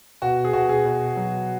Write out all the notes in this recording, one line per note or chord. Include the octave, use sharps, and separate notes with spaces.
B2 F#4
G#4
B2 F#4
G#4
B2
F#3